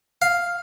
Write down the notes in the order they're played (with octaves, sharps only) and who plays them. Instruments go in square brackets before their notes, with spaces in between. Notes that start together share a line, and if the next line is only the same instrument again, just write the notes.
[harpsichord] F5